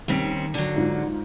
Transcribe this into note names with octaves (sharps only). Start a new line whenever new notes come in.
D#2 G3 C4 C#4 B6 D7
D3 F#3
G#2 F4